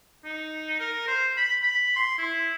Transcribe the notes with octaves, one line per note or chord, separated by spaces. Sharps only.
D#4
A#4
C5
B5
B5
C6
E4